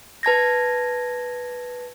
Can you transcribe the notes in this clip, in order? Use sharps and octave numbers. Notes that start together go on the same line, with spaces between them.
B4 A5 G#6 A#6